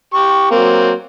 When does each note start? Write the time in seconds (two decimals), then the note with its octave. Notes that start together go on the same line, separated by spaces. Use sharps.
0.14 G4 C#6
0.51 F#3 A#3 C4